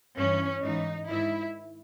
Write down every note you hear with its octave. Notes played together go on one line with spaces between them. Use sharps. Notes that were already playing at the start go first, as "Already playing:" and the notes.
G2 E3 C#4
G#2 E3 D#4
G#2 D#3 E4